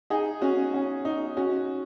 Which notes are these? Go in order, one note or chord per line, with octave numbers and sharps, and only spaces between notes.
D#4 G#4
C#4 F#4
C#4
D#4
C#4 F#4